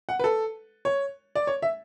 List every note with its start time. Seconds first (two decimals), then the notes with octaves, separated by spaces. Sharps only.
0.09 F#5
0.19 B4
0.24 A4
0.85 C#5
1.35 D5
1.47 C#5
1.62 E5